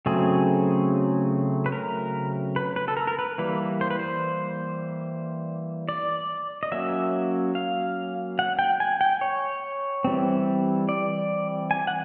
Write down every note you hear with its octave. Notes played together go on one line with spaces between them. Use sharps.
C#3 F#3 A3 C4 G#4
B4
A#4
B4
B4
A4
A#4
A#4
B4
E3 G3 A#3 B4
C5
B4
C5
D5
D#5
F#3 A#3 C#4 E5
F5
F#5
G5
G#5
G5
C#5
E3 G3 C4
D5
G#5
F#5